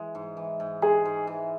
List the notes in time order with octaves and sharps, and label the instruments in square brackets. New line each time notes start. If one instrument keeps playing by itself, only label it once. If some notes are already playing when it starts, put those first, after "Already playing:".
Already playing: [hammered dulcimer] E3 G#3
G#2
E3
G#2
[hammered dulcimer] G#3 [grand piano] G#4
[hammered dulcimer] G#2
E3